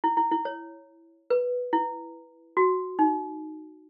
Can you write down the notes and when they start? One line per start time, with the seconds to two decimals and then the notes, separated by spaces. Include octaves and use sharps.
0.04 E4
0.17 E4
0.32 E4
0.45 C#5
1.30 B4
1.73 E4
2.57 F#4
2.99 D#4